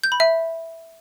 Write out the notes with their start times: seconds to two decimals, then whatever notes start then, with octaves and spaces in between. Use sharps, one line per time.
0.04 G6
0.12 B5
0.20 E5